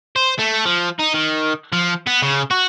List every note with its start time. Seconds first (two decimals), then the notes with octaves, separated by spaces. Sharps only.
0.16 C5
0.39 A3
0.65 F3
0.99 D#4
1.14 D#3
1.73 F3
2.07 B3
2.22 C#3
2.51 F#4